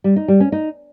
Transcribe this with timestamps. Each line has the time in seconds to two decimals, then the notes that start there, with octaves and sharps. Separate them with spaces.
0.04 G3
0.16 D#4
0.28 G3
0.40 C#4
0.52 D#4